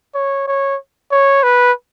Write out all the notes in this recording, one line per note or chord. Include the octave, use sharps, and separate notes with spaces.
C#5
C#5
C#5
B4